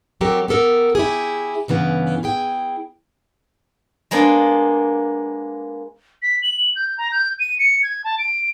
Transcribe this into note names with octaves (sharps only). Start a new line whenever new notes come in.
F#3 C4 F#4 G4 A4 A#4
B3 G4 A4 A#4
E4 G4 G#4
G2 C#3 E3 B3
E4 G#4 G5
G#3 A#3 B3 D4
B6
F#7
G6
A#5
G6
D#7
C#7
G#6
A5
D7